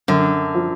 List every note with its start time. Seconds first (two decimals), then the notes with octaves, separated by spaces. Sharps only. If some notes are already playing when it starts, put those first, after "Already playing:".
0.08 F#2 D3
0.55 F3